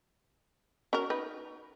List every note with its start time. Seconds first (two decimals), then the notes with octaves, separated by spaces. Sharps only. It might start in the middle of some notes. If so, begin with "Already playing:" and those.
0.93 C#4 F#4 A#4
1.10 D#4 B4